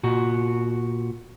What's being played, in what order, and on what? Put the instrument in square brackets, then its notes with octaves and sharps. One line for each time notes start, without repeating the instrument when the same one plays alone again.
[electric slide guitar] A#2 F#4